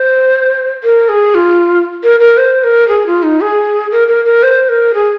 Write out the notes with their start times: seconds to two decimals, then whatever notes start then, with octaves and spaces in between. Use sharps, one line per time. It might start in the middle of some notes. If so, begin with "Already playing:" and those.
Already playing: C5
0.84 A#4
1.09 G#4
1.35 F4
2.04 A#4
2.20 A#4
2.37 C5
2.64 A#4
2.88 G#4
3.07 F4
3.23 D#4
3.41 G#4
3.91 A#4
4.08 A#4
4.25 A#4
4.43 C5
4.69 A#4
4.94 G#4